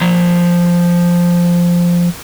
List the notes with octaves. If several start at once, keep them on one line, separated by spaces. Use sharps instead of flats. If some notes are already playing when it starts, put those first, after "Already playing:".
F3 A#5